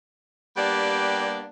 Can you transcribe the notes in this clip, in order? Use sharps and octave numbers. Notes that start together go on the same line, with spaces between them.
G3 A#3 B3 D4 G4 D5